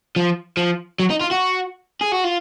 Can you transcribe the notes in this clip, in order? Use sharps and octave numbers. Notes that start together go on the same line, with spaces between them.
F3
F3
F#3
D#4
F4
F#4
G#4
F#4
F4